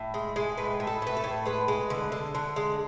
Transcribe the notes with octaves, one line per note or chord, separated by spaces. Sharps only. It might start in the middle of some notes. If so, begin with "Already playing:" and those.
Already playing: A2
G#3
G#3
A2 B4
A2
A4
A2 B4
A4
A2
G#3 B4
G#3
D3
D3
D3
G#3